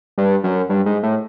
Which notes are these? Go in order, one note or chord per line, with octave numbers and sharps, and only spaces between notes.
G2
F#2
G2
G#2
A2